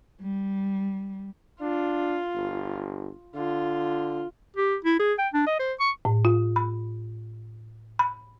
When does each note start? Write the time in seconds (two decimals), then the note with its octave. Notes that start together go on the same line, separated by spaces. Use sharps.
0.22 G3
1.61 D4 F4
2.35 G1
3.35 D3 F4
4.56 G4
4.84 E4
5.00 G#4
5.18 G5
5.34 D4
5.46 D#5
5.59 C5
5.80 C#6
6.05 A2
6.25 F4
6.56 B5
7.99 B5